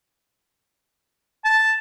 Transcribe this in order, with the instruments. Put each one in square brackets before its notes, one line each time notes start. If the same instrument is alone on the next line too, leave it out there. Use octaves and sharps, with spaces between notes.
[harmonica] A5